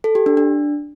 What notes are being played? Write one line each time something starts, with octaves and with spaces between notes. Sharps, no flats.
A4
G4
D4
D4